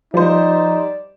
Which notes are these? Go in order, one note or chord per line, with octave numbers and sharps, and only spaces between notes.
F3 G3 D#4 C5 D5